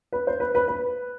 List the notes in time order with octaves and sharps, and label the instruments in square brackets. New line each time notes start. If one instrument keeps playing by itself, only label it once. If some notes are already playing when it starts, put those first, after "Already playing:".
[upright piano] B4
C5
B4
B4
B4